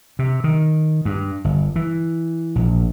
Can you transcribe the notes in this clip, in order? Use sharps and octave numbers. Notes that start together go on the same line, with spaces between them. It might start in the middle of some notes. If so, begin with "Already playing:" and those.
C3
D#3
G2
G1
E3
A#1